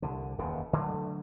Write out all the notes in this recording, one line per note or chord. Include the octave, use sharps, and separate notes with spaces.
C2 D3
E1 D#2 C#3
D3 F#3 A3